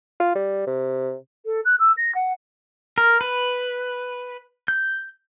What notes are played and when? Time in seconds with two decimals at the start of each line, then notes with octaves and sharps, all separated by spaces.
0.20 F4
0.36 G3
0.67 C3
1.45 A4
1.65 F#6
1.80 E6
1.97 A#6
2.15 F#5
2.98 A#4
3.21 B4
4.68 G6